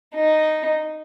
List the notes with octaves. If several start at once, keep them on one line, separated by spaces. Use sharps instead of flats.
D#4